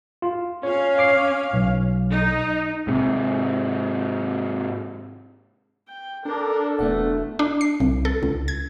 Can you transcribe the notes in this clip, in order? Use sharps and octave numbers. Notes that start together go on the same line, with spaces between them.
F4
C#4 C#5 F5
C#5 D6 C7
B1
D#4
G#2 C3
G5
D4 A4 A#4
E1 A3 B3 D4 F#5
D4
C7
C2
A4
C#2
G#6